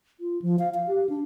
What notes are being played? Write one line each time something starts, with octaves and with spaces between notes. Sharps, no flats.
F4
F3
F5
F5
G4
D4